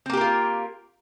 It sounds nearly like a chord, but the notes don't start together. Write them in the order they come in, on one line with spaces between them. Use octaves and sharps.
C4 A#3 G4 A#4 F4